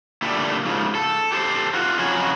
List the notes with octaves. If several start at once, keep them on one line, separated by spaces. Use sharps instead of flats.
A#2 D3 G3 A3
G#2 C#3 F3
A4
G4 A4 C5
F4 F#4
F2 C#3 F#3 F#4 G#5